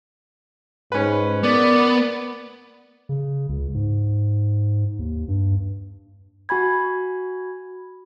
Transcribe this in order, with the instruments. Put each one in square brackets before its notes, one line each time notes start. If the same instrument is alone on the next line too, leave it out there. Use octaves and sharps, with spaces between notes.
[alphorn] G#2 [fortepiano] C#4 B4
[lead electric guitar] B3 [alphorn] A#4 [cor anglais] D5
[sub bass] C#3
C#2
G#2
D#2
G2
[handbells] F#4 G#5 B5 G#6